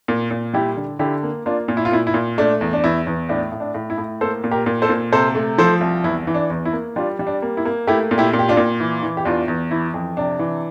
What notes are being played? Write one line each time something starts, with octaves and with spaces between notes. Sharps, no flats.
A#2
A#2
G3 E4 G4
D3
D3 E4 G4
A#3
A#3 D4 F4
A#2
E4
F4
A#2 E4
E4
A#2
A3 D4
E2
D4
E2 E4
E2
A2 D4
A2
D4
A2
E4
A2
A#3 A4 C5
A#2
G4 A#4
A#2
A4 C5
A#2
C3 A4 C5
A3
F3 A4 C5
C2
E2 E4
E3
D4
E2
E4
A#3
G3 D4 F4
G3
D4
A#3
E4
A#3
A3 E4 G4
A#2
E4 G4
A#2
G4
D4 F4
A#2
E3
E3
G4
E2 D4 F4
E2
E3 E4
F2
C3 D4
E3